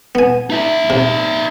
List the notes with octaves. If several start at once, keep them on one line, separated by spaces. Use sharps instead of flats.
B3 G#5
D#4 E5
C3